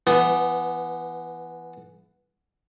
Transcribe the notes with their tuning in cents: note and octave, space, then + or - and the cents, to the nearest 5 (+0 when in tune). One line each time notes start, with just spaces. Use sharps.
E3 +25 B3 +0